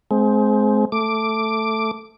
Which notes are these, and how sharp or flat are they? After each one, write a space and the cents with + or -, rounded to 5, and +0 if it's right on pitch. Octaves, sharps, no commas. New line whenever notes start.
G#3 +35 C4 +0
A3 +5 D6 +0